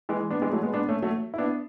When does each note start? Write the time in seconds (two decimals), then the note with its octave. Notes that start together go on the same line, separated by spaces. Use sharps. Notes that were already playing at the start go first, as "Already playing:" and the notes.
0.09 E3 G#3
0.31 B3 D4
0.42 E3 G#3
0.52 F#3 A3
0.63 G#3 B3
0.73 B3 D4
0.89 A3 C#4
1.02 F#3 A3
1.34 E4
1.38 B3 D4